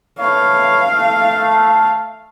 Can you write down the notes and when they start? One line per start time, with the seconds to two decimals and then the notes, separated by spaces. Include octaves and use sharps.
0.19 A3 B4 C#5 F5
0.92 A3